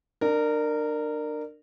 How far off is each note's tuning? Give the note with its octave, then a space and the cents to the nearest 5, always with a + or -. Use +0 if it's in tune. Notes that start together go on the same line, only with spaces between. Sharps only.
D4 +30 A#4 -15